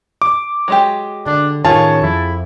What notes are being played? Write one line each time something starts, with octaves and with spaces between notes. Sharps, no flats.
D6
F#3 G#3 G4
D3 D4
A2 D#3 C#4 F4 G#4 C#5 A5
F2 E4